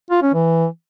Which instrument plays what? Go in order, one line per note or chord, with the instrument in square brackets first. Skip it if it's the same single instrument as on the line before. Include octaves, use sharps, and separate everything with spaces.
[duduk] F4
C#4
E3